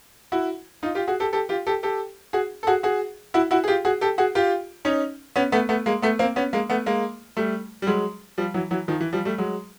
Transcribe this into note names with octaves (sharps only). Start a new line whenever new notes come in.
E4 F#4
D#4 F4
F4 G4
F#4 G#4
G4 A4
G4 A4
F4 G4
G4 A4
G4 A4
F#4 G#4
A4
F#4 G#4
F#4 G#4
E4 F#4
E4 F#4
G#4
F4 G4
F#4 G#4
G4 A4
F#4 G#4
F4 G4
C#4 D#4
B3 C#4
A3 B3
A3 B3
G#3 A#3
A3 B3
A#3 C4
B3 C#4
G#3 A#3
A3 B3
G#3 A#3
G3 A3
G3
F#3 G#3
F3 G3
E3 F#3
E3 F#3
D#3 F3
E3
F3 G3
G3 A3
F#3 G#3